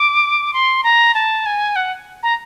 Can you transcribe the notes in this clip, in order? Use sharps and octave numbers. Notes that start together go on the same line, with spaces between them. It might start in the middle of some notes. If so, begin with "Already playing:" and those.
Already playing: D6
C6
A#5
A5
G#5
F#5
A#5